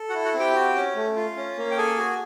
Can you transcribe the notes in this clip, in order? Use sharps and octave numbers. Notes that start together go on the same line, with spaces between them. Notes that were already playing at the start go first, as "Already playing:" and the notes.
Already playing: A4
F#4 F#5
E4
F#4 F#5
C4
G4 G5
F#4
C#4
A3
F4
C#4
A#3
G5
G#4 A4 G#5
F#4